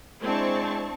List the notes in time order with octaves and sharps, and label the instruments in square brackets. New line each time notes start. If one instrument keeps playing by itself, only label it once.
[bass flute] G#3 [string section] C4 A5 C#6 [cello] D4 E4